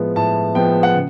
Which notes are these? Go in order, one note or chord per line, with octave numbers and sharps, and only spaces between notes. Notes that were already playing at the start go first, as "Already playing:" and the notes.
Already playing: A2 F3 G#3 B3
A2 A5
F3 G#3 B3 G5
F#5
C#3